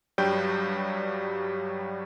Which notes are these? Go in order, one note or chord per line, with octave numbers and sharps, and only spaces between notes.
G2 F#3 G3 G5 G6